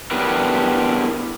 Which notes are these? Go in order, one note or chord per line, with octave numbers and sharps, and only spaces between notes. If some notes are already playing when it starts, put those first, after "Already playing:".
B3 D4 E4 G4 A#4 B4